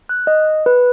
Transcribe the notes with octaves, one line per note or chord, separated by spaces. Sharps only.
F#6
D#5
B4